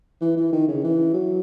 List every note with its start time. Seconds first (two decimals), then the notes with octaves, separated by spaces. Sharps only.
0.21 E3
0.37 E3
0.52 D#3
0.68 C#3
0.84 E3
1.14 F#3